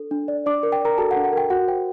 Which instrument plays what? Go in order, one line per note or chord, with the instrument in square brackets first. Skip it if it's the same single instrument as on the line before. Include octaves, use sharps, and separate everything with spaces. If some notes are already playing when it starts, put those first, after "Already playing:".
Already playing: [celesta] D4 A4
D4
D5
D4 D5 D6
A#4
G5
A#4 D5 A#5
F#4 A4 A5
F#5
D4
F#5
A#4 G5
F#4 F#5
C5 G5